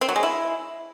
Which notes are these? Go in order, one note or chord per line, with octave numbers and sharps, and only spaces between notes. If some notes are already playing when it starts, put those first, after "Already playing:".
C4
F#3
G#3
E4